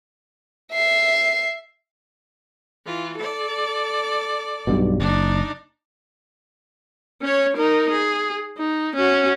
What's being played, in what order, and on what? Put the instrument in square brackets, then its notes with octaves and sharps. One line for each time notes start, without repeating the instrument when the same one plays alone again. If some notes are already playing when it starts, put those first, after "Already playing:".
[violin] E5 C7
[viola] E3 F4
A4 D5
[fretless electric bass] B1 G2 B2
[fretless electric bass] F#1 [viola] D4 D#4
[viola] C#4 C#5
D#4 A#4
G#4
D#4
C#4 F#4